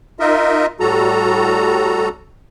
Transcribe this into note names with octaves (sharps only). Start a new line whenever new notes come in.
D#4 F4 A#4 D#5 E5
A2 G3 F#4 A4 A#5